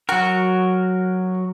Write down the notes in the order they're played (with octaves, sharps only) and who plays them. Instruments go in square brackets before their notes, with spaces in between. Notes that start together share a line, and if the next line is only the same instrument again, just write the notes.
[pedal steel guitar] F#3 A#4 [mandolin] F#4